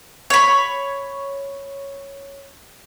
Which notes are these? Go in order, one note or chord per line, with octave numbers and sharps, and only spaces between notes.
C#5 B5